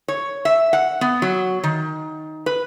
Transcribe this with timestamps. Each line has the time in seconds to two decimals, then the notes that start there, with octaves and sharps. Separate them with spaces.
0.08 C#5
0.45 E5
0.73 F#5
1.01 B3
1.22 F#3
1.64 D#3
2.46 B4